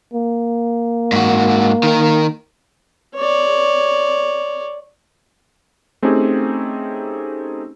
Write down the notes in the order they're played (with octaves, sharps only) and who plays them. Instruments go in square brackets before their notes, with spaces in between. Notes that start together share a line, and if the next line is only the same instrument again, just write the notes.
[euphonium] A#3
[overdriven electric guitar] G#2 F#4
D#3 A#4
[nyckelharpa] C#5 D5
[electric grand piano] A3 C4 C#4 D#4 G4 G#4